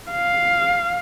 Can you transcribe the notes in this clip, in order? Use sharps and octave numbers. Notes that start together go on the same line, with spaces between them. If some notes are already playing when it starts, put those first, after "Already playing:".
F5